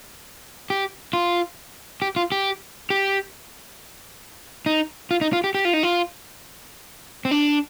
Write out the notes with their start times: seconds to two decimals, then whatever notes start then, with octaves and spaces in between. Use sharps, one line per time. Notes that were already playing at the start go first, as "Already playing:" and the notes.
0.70 G4
1.13 F4
2.02 G4
2.16 F4
2.32 G4
2.90 G4
4.66 D#4
5.11 F4
5.21 D#4
5.33 F4
5.44 G4
5.55 G4
5.65 F4
5.73 D#4
5.83 F4
7.25 C4
7.31 D4